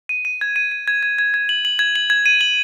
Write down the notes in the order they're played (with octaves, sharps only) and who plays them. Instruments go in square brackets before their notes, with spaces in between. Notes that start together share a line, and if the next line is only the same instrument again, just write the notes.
[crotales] D#7
D#7
G#6
D#7
D#7
G#6
G#6
G#6
G#6
F#7
F#7
G#6
F#7
G#6
D#7
F#7